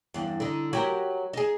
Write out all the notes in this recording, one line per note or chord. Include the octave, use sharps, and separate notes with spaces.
E2 G2
D3 D#4
F#3 G4 A#4
D#4 G#4